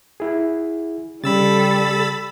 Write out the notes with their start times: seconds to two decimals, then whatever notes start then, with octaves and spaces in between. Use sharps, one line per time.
0.20 E4 G#4
1.24 C#3 G3 A4 B5 E6 A6